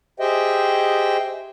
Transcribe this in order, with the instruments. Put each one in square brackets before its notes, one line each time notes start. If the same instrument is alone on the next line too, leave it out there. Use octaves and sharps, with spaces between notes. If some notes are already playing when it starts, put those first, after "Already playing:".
[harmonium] G4 G#4 C5 D#5 E5 G5